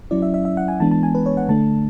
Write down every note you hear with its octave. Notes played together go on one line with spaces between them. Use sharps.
F#3 C#4 E4 D5
E5
E5
E5
F#5
G#5
E3 G#3 B3 D4 A5
A5
G#5
B4
C#5
F#5
D3 A3 D4 A5